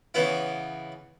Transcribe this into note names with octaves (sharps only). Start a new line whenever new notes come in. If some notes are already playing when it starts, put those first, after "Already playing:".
C#3 E3 B3 E4